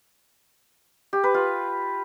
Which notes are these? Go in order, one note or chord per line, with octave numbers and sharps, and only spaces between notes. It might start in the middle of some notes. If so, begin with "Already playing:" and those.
G4
B4
F4